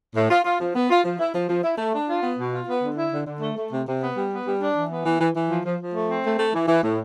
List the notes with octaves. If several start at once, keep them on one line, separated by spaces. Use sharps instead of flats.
A2
F4
F4
F3
B3
F4
F3
E4
F3
F3
E4
A3
D4
F4
B3
B2
F4
B3
D3
E4
D3
D3
A3
A3
C3
C3
B3
G3
B3
G3
D4
E3
B3
E3
E3
E3
F3
F3
F3
A3
C4
A3
A3
E3
E3
A2